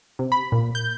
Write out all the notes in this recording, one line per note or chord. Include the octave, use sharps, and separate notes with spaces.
C3
B5
A#2
G6